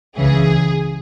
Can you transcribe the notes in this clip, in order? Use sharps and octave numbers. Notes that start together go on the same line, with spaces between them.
C#2 C#3 E3 G#4